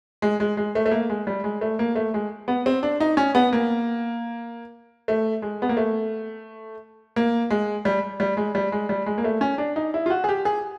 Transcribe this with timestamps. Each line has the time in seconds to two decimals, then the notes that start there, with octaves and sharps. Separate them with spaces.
0.22 G#3
0.40 G#3
0.57 G#3
0.75 A3
0.86 A3
0.91 A#3
1.10 G#3
1.27 G3
1.44 G#3
1.61 A3
1.79 A#3
1.95 A3
2.14 G#3
2.48 B3
2.66 C4
2.83 D4
3.00 D#4
3.17 C#4
3.35 B3
3.53 A#3
5.08 A3
5.42 G#3
5.62 B3
5.69 A#3
5.77 A3
7.16 A#3
7.50 G#3
7.85 G3
8.20 G3
8.37 G#3
8.55 G3
8.72 G#3
8.89 G3
9.06 G#3
9.18 A#3
9.24 A3
9.41 C#4
9.58 D4
9.76 D#4
9.94 E4
10.06 F4
10.10 F#4
10.24 G#4
10.29 G4
10.45 G#4